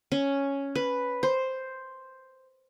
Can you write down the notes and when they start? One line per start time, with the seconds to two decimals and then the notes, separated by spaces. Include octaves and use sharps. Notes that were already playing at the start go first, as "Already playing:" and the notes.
0.12 C#4
0.75 B4
1.23 C5